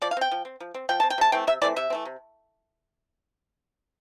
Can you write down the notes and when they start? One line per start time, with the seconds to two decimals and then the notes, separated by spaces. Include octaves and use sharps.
0.02 F3 D5
0.11 F5
0.17 C4 G5
0.31 F3
0.45 C4
0.60 F3
0.74 C4
0.89 F3 G5
1.00 C4 A5
1.10 G5
1.18 C3 A5
1.32 E3 A3 C4 G5
1.47 C3 E5
1.62 E3 A3 C4 D5
1.76 C3 E5
1.90 E3 A3 C4
2.05 C3